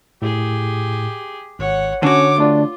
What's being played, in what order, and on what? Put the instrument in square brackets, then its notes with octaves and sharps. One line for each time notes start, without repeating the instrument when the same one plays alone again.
[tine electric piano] A2 [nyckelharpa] G4 G#4
[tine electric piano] G#1 [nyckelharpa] C#5 F#5
[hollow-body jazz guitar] D3 F#4 [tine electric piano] C#4 [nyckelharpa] C#5 D6
[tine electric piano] A3 D4 D5 [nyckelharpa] F4